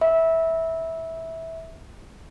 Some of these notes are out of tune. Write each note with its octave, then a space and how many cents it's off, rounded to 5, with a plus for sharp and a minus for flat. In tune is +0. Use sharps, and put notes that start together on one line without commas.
E5 -15 B5 -25